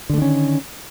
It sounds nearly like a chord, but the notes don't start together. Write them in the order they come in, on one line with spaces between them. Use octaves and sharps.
D3 A3 D#3 C#4